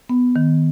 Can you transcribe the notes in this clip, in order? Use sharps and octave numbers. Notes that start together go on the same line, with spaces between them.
B3
D#3